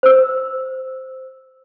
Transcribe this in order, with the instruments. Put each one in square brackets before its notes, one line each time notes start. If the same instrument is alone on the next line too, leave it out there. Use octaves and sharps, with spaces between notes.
[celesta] C5 E6